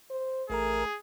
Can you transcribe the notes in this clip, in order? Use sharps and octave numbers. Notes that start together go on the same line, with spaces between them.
C5
A1 A3 G#4 A#4 A#5